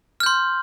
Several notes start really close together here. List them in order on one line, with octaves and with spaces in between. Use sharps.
F6 G6 C6